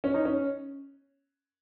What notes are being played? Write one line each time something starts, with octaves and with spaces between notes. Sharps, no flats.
C#4
D#4
C#4